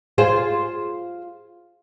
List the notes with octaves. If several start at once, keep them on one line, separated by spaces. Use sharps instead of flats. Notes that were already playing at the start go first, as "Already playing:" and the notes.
F4 G#4 C5